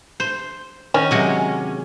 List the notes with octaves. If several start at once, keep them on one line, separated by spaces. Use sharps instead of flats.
C5
D#3 C#4
C3 F#3 G#3